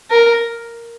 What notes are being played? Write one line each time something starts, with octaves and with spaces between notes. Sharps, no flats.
A#4